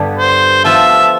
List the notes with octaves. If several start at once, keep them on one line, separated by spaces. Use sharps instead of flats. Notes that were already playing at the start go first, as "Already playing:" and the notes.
Already playing: G2 D3 G3 B3
C5
F3 B3 F4 A4 E5